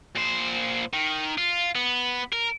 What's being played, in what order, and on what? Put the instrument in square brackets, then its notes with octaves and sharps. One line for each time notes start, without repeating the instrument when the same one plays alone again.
[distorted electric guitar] A#2 C5
D#3
F4
B3
A#4